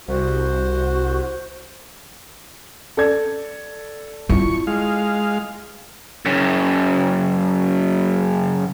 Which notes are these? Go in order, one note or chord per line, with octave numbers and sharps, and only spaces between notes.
C2 F#4 C5
A4 D5 G#6
E4 F4 C#6
G#3 F5
F#2 C#3